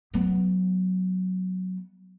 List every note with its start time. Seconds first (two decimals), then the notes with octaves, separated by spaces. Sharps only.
0.14 F#3 B3